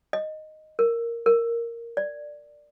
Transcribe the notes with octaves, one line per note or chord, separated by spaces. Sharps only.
D#5
A#4
A#4
D5